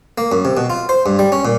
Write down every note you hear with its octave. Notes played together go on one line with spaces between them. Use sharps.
A#3
F#2
C3
B2
F4
C5
G2
G3
C#4
A#2